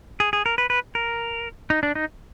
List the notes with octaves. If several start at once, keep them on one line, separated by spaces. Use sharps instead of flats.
G#4
G#4
A#4
B4
B4
A#4
D#4
D4
D#4